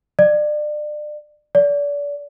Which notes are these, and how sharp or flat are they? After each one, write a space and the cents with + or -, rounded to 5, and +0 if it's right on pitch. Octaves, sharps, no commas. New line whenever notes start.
D5 +30
D5 -30